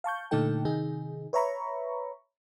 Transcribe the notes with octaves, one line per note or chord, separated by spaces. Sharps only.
F5 A5 C#6 G6
A#2 D3 A3 D#4 A4 G5
C3 D#3 D#4 G#4
B4 C#5 E5 A#5 B5 C#6